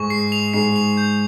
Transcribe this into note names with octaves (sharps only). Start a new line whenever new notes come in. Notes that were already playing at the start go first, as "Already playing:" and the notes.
Already playing: G#2 G#3 C#6
C7
F7
G#2 G#3 C7
F7
G6